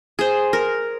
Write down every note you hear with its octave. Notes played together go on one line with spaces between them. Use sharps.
G#4 C5
A#4